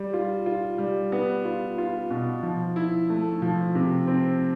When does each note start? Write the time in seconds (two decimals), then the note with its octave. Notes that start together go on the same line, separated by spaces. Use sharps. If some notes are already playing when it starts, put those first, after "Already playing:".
Already playing: G3
0.13 F4
0.46 F4
0.78 G3
1.12 B3
1.45 F4
1.78 F4
2.10 B2
2.43 F3
2.76 E4
3.10 A3
3.42 F3
3.75 C3
4.07 C4